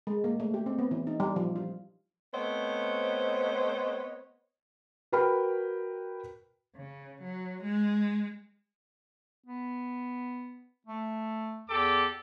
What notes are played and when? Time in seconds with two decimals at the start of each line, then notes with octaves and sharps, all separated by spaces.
0.07 G#3
0.24 A#3
0.40 A3
0.54 G4
0.66 C4
0.78 B3
0.91 E3
1.07 D#4
1.20 G3
1.36 F3
1.56 F4
2.34 A3 B3 C4 C5 C#5 D#5
5.12 F#4 A#4 B4 G5 B5 F6
6.76 C#3
7.23 F#3
7.64 G#3
9.46 B3
10.87 A3
11.69 E2 G4 A4 D6